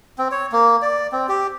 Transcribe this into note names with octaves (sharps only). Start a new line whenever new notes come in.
C4
C#5
A#3
D5
C4
G4